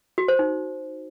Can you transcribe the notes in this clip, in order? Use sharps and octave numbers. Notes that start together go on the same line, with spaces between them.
F#4
C5
D#4